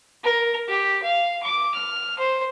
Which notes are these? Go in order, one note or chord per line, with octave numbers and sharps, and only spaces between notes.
A#4
G4
F5
D6
F6
C5